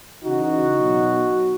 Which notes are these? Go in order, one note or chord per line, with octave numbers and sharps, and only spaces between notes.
C#3 E3 D#4 F#4
B2 F#3